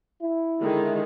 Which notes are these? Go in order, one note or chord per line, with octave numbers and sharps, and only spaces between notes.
E4
D3 D#3 G#3